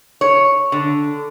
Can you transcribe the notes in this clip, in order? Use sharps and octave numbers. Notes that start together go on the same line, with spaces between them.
C#5
D3